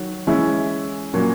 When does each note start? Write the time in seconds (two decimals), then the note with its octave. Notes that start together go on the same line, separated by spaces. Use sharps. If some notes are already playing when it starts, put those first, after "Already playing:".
Already playing: D#3 F#3
0.27 E3 G#3 C#4 E4
1.14 A#2 F#3 A#3 C#4